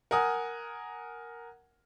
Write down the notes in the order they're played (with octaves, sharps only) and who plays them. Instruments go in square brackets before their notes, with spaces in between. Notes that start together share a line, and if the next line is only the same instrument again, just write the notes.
[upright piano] A#4 F#5 G#5 D#6